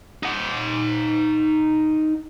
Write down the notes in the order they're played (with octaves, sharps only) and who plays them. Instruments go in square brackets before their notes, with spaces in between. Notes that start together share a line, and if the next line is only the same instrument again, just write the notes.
[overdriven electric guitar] D#4 F#5